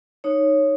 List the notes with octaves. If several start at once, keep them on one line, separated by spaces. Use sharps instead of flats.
D#4 C#5